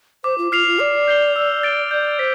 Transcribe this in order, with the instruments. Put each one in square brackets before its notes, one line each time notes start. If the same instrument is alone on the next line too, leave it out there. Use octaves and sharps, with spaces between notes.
[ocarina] C5 [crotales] D6
[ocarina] F4
[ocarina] F4 [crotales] F6 C7 F7
[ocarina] F4
[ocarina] D5 [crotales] D6
[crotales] G6 C7 G7
E6
A6 D7 G7
[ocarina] D5 [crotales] G6
[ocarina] C5 [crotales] B6